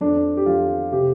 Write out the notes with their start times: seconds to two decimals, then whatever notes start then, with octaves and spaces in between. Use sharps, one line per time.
0.01 F2 D4
0.37 G4
0.46 F2 F4
0.92 C3 G4